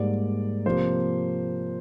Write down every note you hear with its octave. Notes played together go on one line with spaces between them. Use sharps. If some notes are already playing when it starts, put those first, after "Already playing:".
Already playing: G#2 G3 A#3 D5
C3 F3 A#3 C5